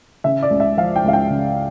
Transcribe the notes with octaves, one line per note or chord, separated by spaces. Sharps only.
C#3 E5
D5
C#2
E5
F3 F5
G5
C#2 F5
G5
C#3